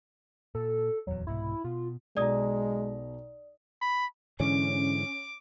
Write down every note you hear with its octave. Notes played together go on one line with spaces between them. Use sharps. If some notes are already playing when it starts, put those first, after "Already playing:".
A#2 A4
D#1 E2 F#3
C2 G#2 B2 E4
B2 F4
B1 B2 G#3 D5 A#5 D#6
B5
G#2 D3 E3 C#4 D6